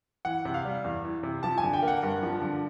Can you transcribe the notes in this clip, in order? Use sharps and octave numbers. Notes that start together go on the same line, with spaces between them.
E3 F#5
C3
F5
G3
E2
E3
C3
F3 A5
G#5
D3
G5
A#3
F#5
G2
F3
D3